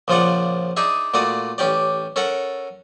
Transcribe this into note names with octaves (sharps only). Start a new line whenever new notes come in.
A#1 C#3 F3 F4 D5 F#5
D4 D#4 G#4 E5
A#2 A3 F#4 D5 D#6
A1 C#4 G4 D5
C#4 A4 A#4 F#5